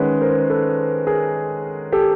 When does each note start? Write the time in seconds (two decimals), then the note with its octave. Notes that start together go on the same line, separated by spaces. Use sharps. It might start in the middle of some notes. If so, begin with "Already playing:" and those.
Already playing: D#3 G#3 C#4 B4 C#5 F#5
0.21 A#4 C5
0.50 A4 B4
1.07 G#4 A#4
1.92 G4 A4